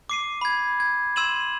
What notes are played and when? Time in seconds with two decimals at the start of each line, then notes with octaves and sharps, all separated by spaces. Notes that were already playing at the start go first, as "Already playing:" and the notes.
0.09 D6 C7 D#7
0.41 B5 G#6
0.80 G#6
1.16 C6 E6 G#6 D#7 E7 F#7